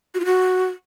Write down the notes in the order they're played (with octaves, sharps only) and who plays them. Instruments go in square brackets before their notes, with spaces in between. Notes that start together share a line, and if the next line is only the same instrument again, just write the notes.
[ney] F#4
F4
F#4